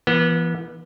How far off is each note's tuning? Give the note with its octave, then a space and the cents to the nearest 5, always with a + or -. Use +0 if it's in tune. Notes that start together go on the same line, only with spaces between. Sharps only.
E3 +40 B3 -30